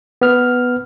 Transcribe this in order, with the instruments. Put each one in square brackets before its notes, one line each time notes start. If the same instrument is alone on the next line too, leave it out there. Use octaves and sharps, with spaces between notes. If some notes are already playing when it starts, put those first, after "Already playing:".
[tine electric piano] B3 F6